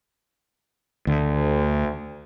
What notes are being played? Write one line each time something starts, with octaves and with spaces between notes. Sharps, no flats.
D2